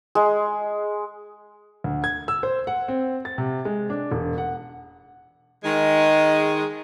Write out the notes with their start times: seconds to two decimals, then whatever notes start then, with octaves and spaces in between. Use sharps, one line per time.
0.15 G#3
1.84 D2
2.04 G#6
2.28 E6
2.43 C5
2.67 F#5
2.88 C4
3.25 A6
3.38 C3
3.65 G#3
3.90 D4
4.12 E1
4.38 F#5
5.64 D#3 G#3